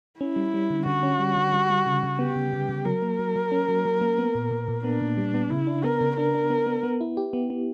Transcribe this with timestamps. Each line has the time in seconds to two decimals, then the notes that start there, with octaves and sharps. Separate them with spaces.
0.20 C#4 E4
0.36 G3
0.54 G3
0.70 D3
0.86 D3 F#4
1.03 C#4
1.19 G3
1.36 D3
1.53 G3
1.70 G3
1.87 C#3
2.03 C#3
2.19 B3 G4
2.36 C#3
2.53 C#3
2.69 C#3
2.85 F#3 A#4
3.02 A#3
3.19 F#3
3.36 F#3
3.52 C#4
3.69 F#3
3.85 F#3
4.01 A#3
4.18 B3
4.35 A#2
4.51 A#2
4.68 A#2
4.84 B3 D4
5.01 A#2
5.17 G3
5.34 B3
5.50 C#3 E4
5.67 D4
5.84 B3 A#4
6.01 C#3
6.17 D4 A#4
6.34 D4
6.50 B3
6.66 B3
6.83 B3
7.01 E4
7.17 G4
7.33 B3
7.50 B3